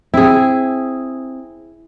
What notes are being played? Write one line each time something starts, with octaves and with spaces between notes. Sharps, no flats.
C4 E4 G#4